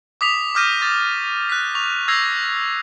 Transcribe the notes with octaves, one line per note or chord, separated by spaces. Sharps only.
D6 D#6 B6 F7
D6 D#6 F6 G6 A#6 D#7
C#6 D#6 A6
F#6 B6
C#6 F7
E6 G6 G#6 A#6 C7 F7